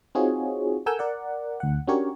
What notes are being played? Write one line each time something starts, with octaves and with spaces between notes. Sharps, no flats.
C4 D#4 F4 F#4 G#4 C#5
A4 A#4 F#5 G#5 E6 G6
A#4 D5 F#5
D2 F#5
C#4 D4 F#4 G4 A#4 C#5